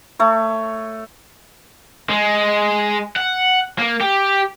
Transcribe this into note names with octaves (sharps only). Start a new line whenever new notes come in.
A3 C#5
G#3
F#5
A#3
G4